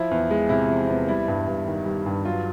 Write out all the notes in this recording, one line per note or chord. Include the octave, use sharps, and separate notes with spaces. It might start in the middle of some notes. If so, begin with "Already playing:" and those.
Already playing: F3 E4
E2
G#3
C3 E4
F3
E2
G3 E4
G2
G2
D#3
G3
G2
F#3 F4